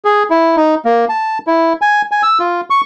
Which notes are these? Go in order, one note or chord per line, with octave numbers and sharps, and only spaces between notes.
G#4
E4
D#4
A#3
A5
E4
G#5
G#5
E6
F4
C#6